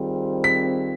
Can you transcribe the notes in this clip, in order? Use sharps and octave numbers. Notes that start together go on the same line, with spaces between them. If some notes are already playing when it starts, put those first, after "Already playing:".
Already playing: D#3 G3 C4 F4 G#4
B6